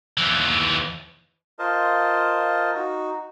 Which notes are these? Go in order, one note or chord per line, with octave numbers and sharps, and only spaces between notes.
D#2 E3
F4 A#4 C5 D#5 A5
D#4 F#4